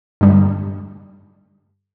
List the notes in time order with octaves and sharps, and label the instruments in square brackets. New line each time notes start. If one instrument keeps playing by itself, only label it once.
[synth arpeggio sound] G2 D3 G3